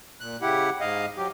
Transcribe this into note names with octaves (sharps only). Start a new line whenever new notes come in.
A#2 F#6
C#3 E4 G4 F#5
G#2 D#5 F5
F#3 G4